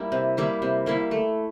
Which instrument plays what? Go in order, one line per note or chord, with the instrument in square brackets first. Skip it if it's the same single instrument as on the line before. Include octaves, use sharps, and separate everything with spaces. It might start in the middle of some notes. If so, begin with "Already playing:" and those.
Already playing: [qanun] G3 A#3 E4
C3
G3 A#3 E4
C3
G3 A#3 E4
A3